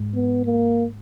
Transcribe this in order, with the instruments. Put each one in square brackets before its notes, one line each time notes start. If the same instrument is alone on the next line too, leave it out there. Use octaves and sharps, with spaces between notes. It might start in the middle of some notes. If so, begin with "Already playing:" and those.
Already playing: [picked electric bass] G#2
[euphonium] B3
A#3